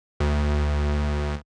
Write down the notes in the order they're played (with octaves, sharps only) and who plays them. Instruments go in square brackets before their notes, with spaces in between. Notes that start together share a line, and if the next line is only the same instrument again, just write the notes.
[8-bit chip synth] D2